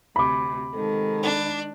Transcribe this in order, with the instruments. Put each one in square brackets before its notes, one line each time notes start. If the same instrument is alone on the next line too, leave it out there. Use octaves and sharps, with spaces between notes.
[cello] D2 C3 [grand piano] B5 D6
[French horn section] G#2 C3 A4 [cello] D#3 G#3
[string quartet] D4